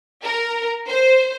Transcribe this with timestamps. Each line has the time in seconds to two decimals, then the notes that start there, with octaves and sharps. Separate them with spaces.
0.23 A#4
0.87 C5